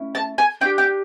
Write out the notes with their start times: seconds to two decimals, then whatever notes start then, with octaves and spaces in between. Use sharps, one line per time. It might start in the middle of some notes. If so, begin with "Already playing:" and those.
Already playing: A3 C#4 E4
0.15 A5
0.38 G#5
0.61 D4 G5
0.65 G4
0.78 G5